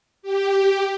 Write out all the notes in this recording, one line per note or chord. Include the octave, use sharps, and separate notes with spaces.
G4